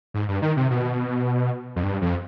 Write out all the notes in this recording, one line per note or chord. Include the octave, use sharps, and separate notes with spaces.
G#2
G2
D#3
C3
B2
F2
G2
F2